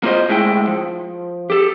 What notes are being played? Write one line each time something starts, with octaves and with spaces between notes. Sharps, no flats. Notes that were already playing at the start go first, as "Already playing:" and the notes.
A#3 F4 C5 D#5
D2 A2 G#3 E4 G5
F3
G4 A4